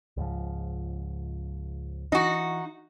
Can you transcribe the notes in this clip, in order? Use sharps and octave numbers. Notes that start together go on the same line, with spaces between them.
C#2 G#2 F3
E3 D#4 F#4